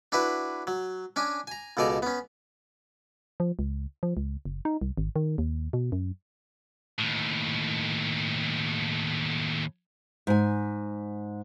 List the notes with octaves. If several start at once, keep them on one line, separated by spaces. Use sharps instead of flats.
D4 E4 F#4 B4
F#3
C#4 D4 G#5
G#5 A#5
C#2 B2 A4 D5 G#5 A#5
B3 C#4
F3
C#2
F3
C#2
F#1
D#4
C2
G#1
D#3
D#2
B2
F#2
D#2 A2
G#2 G#5